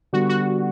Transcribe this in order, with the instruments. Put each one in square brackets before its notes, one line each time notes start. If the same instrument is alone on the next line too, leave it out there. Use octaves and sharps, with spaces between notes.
[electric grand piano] D3 G3 B3 [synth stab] F#4
[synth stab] F#4